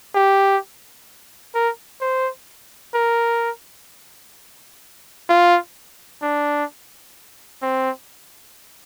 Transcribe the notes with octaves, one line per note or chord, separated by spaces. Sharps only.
G4
A#4
C5
A#4
F4
D4
C4